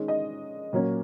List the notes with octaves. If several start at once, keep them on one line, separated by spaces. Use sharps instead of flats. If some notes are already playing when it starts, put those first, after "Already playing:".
Already playing: D#3 G#3 C#4
D#5
A#2 F#3 A#3 C#4